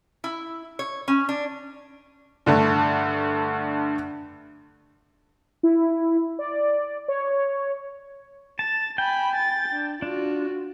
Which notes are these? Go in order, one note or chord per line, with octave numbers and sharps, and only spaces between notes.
E4
C#5
C#4
D4
G2 D3 A3
E4
D5
C#5
A5 A6
G5 G#5 B5
A6
D4
D4 F4 F#4